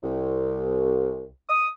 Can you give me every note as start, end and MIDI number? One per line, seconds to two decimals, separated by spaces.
0.03 1.26 36
1.49 1.67 87